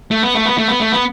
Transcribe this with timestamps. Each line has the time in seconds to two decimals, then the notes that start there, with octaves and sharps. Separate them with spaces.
0.11 A3
0.23 B3
0.35 A3
0.45 B3
0.58 A3
0.68 B3
0.81 A3
0.92 B3